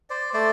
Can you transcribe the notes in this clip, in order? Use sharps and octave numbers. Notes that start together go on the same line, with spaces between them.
C5 D5
A3 C5 D5